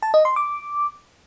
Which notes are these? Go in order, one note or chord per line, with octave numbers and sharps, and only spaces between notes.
A5
D#5
C6
D6